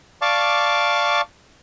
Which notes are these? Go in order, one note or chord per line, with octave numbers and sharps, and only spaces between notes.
D5 F5 A5 C#6 D6